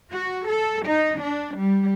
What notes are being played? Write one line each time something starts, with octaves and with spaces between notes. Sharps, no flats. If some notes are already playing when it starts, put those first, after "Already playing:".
F#4
A4
D#4
D4
G3